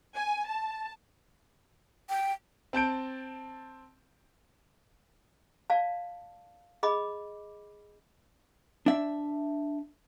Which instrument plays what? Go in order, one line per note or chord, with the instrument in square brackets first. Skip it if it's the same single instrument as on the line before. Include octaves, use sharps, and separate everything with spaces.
[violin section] G#5
A5
[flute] G5
[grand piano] C4 A5 G6 D7
[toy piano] D5 F5 A5
G#4 D#5 B5 D6
[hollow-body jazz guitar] D4 E5